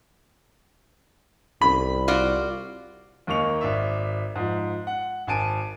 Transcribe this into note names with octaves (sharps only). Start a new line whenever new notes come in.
C2 B5
F4 F#4 D5
D#2 D#3 A#3 C#6 F7
G#1 D5 E5
G#2 F3
F#5
G#1 G#5 A5 D7 D#7